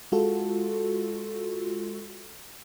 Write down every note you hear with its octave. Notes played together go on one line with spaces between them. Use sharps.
G#3 F4 F#4 A4